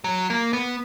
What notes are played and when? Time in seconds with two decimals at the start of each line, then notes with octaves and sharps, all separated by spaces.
0.04 F#3
0.30 A#3
0.53 B3